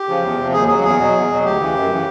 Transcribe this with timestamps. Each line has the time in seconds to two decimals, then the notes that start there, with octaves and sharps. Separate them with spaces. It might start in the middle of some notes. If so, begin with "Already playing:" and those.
Already playing: G4
0.08 C#3 F3
0.24 E2
0.38 C3 F3
0.53 D#2 G#4
0.68 C#3 F#3 G#4
0.83 E2 G#4
0.98 B2 F#3
1.15 E2
1.30 B2 F#3
1.44 D2 G4
1.60 C#3 E3
1.75 F#2
1.90 C#3 E3